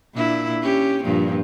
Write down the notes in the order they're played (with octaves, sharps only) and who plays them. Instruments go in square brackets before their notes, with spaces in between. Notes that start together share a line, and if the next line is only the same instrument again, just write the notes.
[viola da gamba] A#2 D4 E4
C#4 G4
G2 A#2 F3